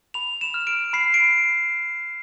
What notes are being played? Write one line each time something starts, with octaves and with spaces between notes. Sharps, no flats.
B5 F7
E7
F6
D7
B5 C7
D7